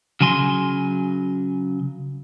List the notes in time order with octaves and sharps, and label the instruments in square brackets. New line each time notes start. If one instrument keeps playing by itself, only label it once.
[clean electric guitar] C#3 F#3 G#5 C6